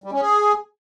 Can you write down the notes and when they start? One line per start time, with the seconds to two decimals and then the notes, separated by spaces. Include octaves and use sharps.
0.04 G3
0.12 C#4
0.21 G#4